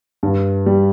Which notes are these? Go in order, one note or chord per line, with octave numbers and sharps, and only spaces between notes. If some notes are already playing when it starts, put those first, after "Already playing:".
G2
G3